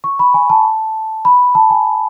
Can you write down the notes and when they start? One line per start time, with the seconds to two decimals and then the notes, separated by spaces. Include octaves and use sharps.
0.04 C#6
0.19 B5
0.34 G#5
0.50 A5
1.25 B5
1.55 A5
1.70 G#5